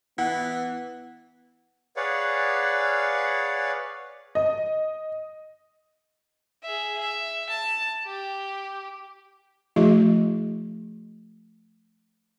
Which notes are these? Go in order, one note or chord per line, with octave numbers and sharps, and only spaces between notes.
E3 B3 F#5
G#4 B4 C#5 D5 F5 F#5
D#5
G#4 E5
E5
A5
G4
F3 A3 E4 F#4 G#4 D#5